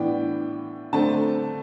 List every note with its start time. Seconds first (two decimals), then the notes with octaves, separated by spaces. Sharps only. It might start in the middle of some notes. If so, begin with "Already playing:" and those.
Already playing: A2 E3 B3 D4 G5
0.93 D3 A3 C4 A5